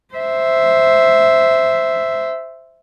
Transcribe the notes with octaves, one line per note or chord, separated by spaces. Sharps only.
C5 E5